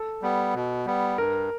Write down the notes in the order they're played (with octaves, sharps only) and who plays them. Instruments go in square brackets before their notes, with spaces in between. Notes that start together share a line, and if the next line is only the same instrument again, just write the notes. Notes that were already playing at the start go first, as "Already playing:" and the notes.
Already playing: [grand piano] A4
[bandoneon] G3 B3
B2
G3 B3
[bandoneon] G2 [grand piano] A#4